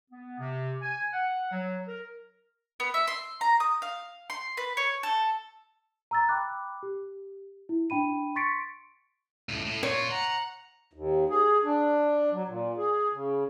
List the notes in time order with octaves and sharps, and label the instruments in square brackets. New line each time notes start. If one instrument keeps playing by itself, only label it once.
[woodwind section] B3
C3
G#5
F#5
F#3
A#4
[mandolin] B3
E5
C6
A#5
D#6
F5
C6
B4
C#5
A4
[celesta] A#5 E6 A6
G5 B5 D6 F#6
G4
E4
D4 G5 B5 D#7
C6 C#6 A6 B6 C#7 D7
[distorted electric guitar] C#2 A2
A2
[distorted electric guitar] A#2 F4 [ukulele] C#5
[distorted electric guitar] F#5 [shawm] A#5
[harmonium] D#2
G#4
D4
F#3
A#2
G#4
C#3